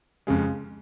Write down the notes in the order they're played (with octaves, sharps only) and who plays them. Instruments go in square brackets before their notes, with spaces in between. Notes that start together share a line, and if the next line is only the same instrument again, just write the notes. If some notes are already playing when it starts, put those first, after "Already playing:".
[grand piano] F2 C#3 G#3